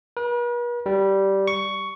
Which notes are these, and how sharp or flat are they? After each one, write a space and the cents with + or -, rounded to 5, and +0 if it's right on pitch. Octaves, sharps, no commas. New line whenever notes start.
B4 -45
G3 -10
C#6 +10